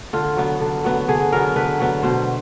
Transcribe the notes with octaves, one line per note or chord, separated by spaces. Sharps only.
D3 F4
F#3 B3
D3
F#3 B3
D3 G#4
F#3 B3 A#4
D3 B4
F#3 B3
B2 C5